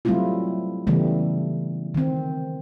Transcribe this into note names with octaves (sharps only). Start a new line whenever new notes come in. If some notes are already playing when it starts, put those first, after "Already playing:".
F#3 G3 A3 C4 E4 F4
C#3 E3 G3 A3 B3
D#3 C4